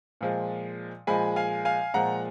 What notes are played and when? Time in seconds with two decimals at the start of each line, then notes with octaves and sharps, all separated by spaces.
0.21 A#2 F3 G#3
1.07 A#2 F3 G#3 G#5 B5
1.36 F5 G#5
1.65 F5 G#5
1.94 A#2 F3 G#3 F#5 A#5